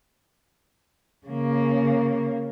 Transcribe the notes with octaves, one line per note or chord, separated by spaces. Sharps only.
C#3 A#3